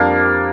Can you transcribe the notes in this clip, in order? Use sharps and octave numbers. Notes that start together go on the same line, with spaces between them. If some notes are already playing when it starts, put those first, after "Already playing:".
Already playing: F2 G3 A#3 D4